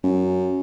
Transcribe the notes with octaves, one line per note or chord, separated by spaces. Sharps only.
F#2